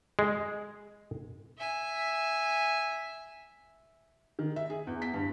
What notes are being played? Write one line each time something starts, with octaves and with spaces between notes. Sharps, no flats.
G#3
E5 G#5
D#3
E5
G#4
E2
B6
G2